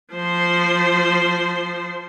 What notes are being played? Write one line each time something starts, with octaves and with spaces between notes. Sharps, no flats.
F3 C5